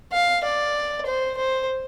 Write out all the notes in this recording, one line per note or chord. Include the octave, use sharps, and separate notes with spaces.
F5
D5
C5
C5